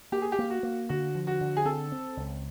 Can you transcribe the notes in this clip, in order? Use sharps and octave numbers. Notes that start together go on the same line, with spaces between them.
A#3 G4
G#4
G4
A#3
F#4
A#3
D3 F#4
F3
F#4
D3
G#4
C4 A4
C4
C#2